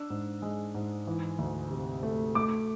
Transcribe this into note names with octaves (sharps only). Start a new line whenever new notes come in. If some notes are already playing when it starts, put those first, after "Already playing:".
Already playing: D4 E6
G#2
G#3
G#2
E3
D2
C3
A3
A3 D6